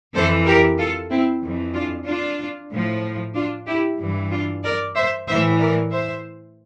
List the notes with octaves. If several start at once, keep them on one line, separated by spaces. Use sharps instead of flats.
F2 E3 A4 C5
G4 A#4
F4 A4
C4 E4
F2 E3
D4 F4
D4 F4
A2 F3
D4 F4
E4 G4
G2 E3
D4 F4
A#4 D5
C5 E5
A2 E3 C5 E5
A#4 D5
C5 E5